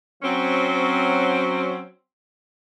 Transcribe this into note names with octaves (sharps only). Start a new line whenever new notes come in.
F#3 C4 C#4